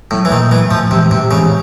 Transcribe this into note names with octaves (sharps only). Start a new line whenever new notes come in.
A2 F#3 A3
E3
A#2 D#3
E3 F#3 A3
A2 F3
C3 E3 G#3 C4
A2 C3
C#3 E3 G#3 C4